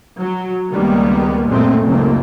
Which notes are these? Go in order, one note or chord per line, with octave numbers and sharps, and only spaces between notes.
F#3
C#2 D#3 G3 G#3 A#3 B3
F#2 A#2 G#3 A3 C4
F#1 C#2 F#2 A3 A#3